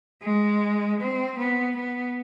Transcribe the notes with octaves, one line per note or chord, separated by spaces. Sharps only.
G#3
C4
B3
B3